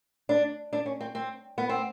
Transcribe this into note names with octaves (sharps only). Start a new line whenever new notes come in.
D4
D4
C#4
C4
C4
B3
C4